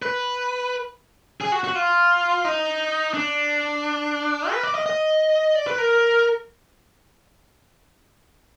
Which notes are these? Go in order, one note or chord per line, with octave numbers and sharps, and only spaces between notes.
B4
G#4
F#4
F#4
F4
D#4
D4
B4
D5
D#5
D#5
D5
B4
A#4